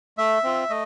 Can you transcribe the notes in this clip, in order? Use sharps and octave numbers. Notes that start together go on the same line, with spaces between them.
A3 E5
C4 F4
A3 D#5